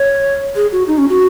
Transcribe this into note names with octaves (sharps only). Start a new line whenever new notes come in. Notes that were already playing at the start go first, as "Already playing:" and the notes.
Already playing: C#5
G#4
F#4
D#4
C#4
F#4